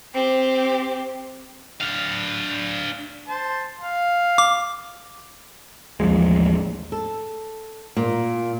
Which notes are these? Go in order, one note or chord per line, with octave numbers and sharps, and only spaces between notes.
C4 G4
D4 F5
C5 A5
F5
D6
A1 D#2 F3 G#3
A4
A#2